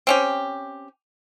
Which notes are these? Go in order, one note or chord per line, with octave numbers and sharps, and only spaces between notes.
C4 C#4 G4